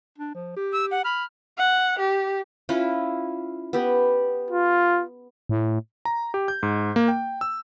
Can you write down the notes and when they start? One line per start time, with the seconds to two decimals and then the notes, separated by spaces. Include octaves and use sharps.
0.18 D4
0.35 F3
0.57 G4
0.73 E6
0.91 F#5
1.05 B5 F6
1.58 F#5
1.99 G4
2.69 C#4 E4 F4
3.73 B3 G4
4.51 F4
5.49 A2
6.05 A#5
6.34 G4
6.48 G6
6.63 G#2
6.96 A#3
7.08 G5
7.41 E6